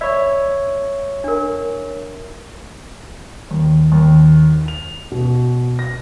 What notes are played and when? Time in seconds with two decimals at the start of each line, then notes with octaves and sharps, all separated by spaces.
0.01 C#5 D5 E5 B5
1.24 D4 A#4
3.51 D#2
3.92 D#2
4.68 F7
5.12 B2
5.79 A#6